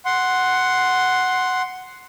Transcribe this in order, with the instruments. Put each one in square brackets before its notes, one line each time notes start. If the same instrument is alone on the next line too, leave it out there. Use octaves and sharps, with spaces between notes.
[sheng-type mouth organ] F#5 C6